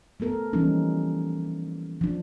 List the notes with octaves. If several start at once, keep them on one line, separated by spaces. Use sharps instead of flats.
A3 B3 A4 A#4
E3 F3 G3 A#3 C#4 D#4
F3 D4